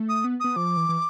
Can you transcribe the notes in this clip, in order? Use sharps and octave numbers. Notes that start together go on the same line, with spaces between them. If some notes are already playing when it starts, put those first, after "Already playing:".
Already playing: A3
D#6
B3
B3 D#6
F3 D6
E3
E3